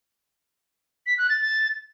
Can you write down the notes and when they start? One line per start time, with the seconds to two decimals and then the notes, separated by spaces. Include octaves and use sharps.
1.06 B6
1.18 F#6
1.29 A6
1.41 A6